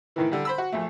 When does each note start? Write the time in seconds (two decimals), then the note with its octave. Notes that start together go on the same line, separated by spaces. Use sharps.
0.16 A2 D#3 E3
0.32 D3 G3
0.45 C5 B5 E6
0.58 F#4
0.72 A#1 A3